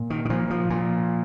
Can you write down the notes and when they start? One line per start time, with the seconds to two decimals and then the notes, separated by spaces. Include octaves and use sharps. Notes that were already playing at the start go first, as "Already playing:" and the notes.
Already playing: A#2
0.10 D#3
0.25 D#3
0.30 A#2 F3
0.50 F3
0.70 A#2